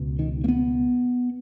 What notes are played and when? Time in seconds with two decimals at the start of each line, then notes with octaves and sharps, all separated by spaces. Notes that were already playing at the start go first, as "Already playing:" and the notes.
Already playing: C#2 B2
0.19 D#3
0.44 A#3
0.48 B3